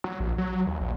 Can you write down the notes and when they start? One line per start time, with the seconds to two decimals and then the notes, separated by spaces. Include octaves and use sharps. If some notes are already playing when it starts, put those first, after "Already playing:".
0.04 F#3
0.20 A#1
0.38 F#3
0.66 D#2
0.81 A#1